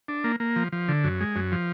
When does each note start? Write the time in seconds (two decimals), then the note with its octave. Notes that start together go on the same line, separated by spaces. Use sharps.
0.08 D4
0.24 A#3
0.40 A#3
0.56 F3
0.72 F3
0.88 D3
1.04 F#2
1.20 G#3
1.36 F#2
1.52 F3